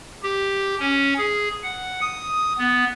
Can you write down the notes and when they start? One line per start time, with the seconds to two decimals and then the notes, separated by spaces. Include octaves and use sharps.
0.23 G4
0.79 C#4
1.18 G#4
1.63 F#5
2.01 D#6
2.58 B3